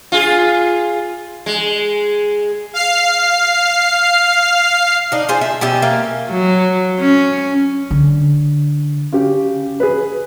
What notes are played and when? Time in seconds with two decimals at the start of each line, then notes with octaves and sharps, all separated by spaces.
0.12 F4 G#4
1.46 G#3
2.73 F5 F6 C7
5.12 D4 D#4
5.29 F4 G#4 C5
5.41 E5
5.61 B2 C#4 G4 E5
5.82 A#3 F5
6.31 F#3
7.00 C#4
7.91 D3
9.12 C#3 G4
9.80 G#4 B4